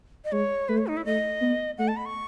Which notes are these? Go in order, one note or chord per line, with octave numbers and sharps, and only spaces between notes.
D#5
G#3 C#5
A3 B4
C#5
D#4
E4
A3 D#5
B3
A3 F#5
A5
B5
C#6